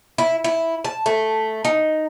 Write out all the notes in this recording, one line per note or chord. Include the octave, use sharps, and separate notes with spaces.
E4
E4
A5
A3
D#4